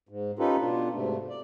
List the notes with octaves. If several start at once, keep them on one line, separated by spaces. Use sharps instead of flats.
G#2
C#4 D#4 F4 G4 A4 B4
B2 D4 F4
G#2 C3 A3
D5